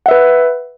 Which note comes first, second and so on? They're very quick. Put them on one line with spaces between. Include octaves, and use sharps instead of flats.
F#5 E5 B4